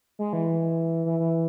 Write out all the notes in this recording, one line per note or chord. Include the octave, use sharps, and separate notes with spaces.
G#3
E3
E3
E3